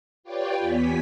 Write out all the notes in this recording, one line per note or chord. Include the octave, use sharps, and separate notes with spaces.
F4 G4 B4 C#5 D5 G5
E2 B3 G#5 B6